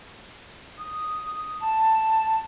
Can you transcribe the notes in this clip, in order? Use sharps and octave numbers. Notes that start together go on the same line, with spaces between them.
D#6
A5